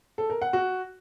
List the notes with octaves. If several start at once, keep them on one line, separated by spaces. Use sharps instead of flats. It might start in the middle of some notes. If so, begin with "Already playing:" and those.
A4
A#4
F#5
F#4